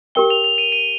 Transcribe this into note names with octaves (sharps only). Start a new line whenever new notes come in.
G4 A#4 G5 G7
F7
F7
D#7
D#7